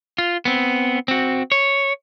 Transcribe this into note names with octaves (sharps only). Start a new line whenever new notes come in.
F4
B3 C4
C4 F#4
C#5